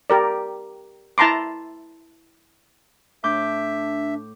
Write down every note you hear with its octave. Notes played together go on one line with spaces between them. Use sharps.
G4 A#4 D5
E4 A5 A#5 C6 D6
A2 D4 E5 D6 G6